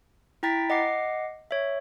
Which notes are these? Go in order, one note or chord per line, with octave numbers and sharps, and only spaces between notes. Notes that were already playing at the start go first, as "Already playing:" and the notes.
E4 G5 A#5 A6 B6
D#5 F#5 D6 C7
C#5 E5